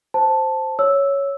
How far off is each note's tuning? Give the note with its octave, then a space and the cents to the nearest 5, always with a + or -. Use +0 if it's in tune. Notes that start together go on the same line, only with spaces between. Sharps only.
C5 +0 A5 +0
C#5 +0 E6 +0